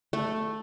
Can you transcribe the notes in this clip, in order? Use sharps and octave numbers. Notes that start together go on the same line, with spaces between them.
A3